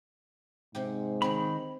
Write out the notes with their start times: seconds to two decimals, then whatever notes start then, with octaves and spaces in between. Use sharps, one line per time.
0.75 G#2 C3 G4
1.22 D#3 C4 C#5 B5